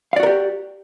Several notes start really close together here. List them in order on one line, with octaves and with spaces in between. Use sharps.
F5 D5 F#4 A#4 G4